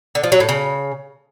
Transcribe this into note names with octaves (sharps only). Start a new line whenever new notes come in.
D3
F3
F#3
A2
C#3